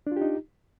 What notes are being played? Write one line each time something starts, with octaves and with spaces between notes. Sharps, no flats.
D4 D#4 F4 G4